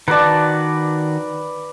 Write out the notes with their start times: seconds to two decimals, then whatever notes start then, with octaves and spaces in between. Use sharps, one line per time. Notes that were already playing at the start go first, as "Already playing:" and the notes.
0.08 D#3 F#4 B4 D5 A5